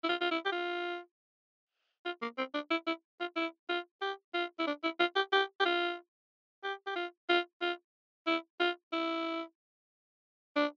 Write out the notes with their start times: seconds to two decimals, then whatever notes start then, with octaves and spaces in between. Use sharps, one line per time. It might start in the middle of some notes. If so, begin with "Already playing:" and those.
0.04 E4
0.09 F4
0.21 F4
0.31 E4
0.45 G4
0.52 F4
2.05 F4
2.22 A#3
2.38 C4
2.54 D4
2.71 E4
2.87 E4
3.20 F4
3.36 E4
3.69 F4
4.02 G4
4.34 F4
4.59 E4
4.67 D4
4.84 E4
5.00 F4
5.16 G4
5.32 G4
5.60 G4
5.65 F4
6.63 G4
6.86 G4
6.96 F4
7.29 F4
7.62 F4
8.27 E4
8.60 F4
8.92 E4
10.56 D4